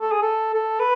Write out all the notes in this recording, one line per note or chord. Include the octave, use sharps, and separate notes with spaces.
A4
G#4
A4
A4
B4